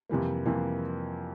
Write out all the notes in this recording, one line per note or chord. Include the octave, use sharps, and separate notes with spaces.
F2 C3 E3 G3 A#3
F2 C3 E3 G3 A#3